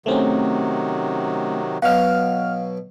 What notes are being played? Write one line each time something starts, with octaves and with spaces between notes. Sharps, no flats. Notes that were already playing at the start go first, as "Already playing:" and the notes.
C3 D#3 F#3 A3 C4 C#4
B2 F#3 F5 F#5 F6